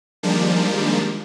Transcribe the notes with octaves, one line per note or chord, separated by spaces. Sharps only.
D#3 F3 G3 G#3 A#3 D4